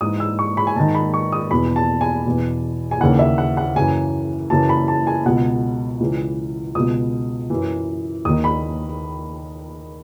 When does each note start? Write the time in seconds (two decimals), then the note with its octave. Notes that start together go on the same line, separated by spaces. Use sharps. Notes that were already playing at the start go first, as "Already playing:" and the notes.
0.01 G#2 E3 D#6
0.20 E6
0.39 C#6
0.57 B5
0.67 G#5
0.76 G#2 D#3 A5
0.95 B5
1.14 C#6
1.32 D#6
1.51 E2 B2 B5
1.76 A5
2.01 G#5
2.26 E2 B2
2.91 G#5
3.01 D#2 C#3 E3 F#5
3.19 E5
3.38 F#5
3.57 F#5
3.76 F#2 C#3 E3 G#5
4.50 F#2 C#3 E3 A5
4.69 B5
4.88 A5
5.07 G#5
5.26 C#2 B2 F#5
6.01 C#2 C#3 E3
6.75 C#2 B2 D#6
7.50 F#2 E3
8.25 D#2 D#3 D#6
8.44 B5